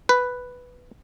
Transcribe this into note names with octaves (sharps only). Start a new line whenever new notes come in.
B4